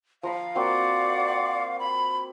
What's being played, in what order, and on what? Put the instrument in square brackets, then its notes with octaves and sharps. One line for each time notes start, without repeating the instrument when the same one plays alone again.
[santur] F3 A#5 B5 [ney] F5
[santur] A#3 C4 F#4 [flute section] D5 F#5 D6
[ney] B5